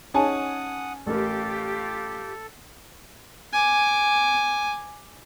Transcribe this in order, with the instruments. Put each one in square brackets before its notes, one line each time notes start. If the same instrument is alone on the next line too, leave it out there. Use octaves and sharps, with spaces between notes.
[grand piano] C#4 G#5 A5 [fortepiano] D#4 G#4 [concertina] F#5 D#6
[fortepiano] A1 A#4 [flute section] F4 G4 [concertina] A4
[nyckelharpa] G#5 D6